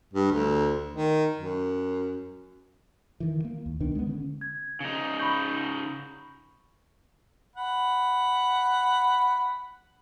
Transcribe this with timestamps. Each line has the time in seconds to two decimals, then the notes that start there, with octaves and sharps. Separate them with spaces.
0.14 G2
0.31 D2
0.94 D#3
1.37 F#2
3.20 D#3 E3
3.45 A#3
3.66 D#2
3.80 C2 B2 D#3 D4
3.95 G#3 B3
4.07 D3 C4 C#4
4.41 G#6
4.80 C#3 D#4
5.19 B5 C#6 G6
7.56 F#5 B5